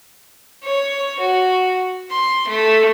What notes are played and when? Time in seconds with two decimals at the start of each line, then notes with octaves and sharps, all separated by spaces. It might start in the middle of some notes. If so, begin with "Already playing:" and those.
0.63 C#5
1.19 F#4
2.11 C6
2.48 A3